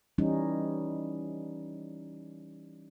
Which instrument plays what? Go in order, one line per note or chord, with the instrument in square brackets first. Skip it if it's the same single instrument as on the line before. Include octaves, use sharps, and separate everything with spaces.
[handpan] E3 G3 C#4 D#4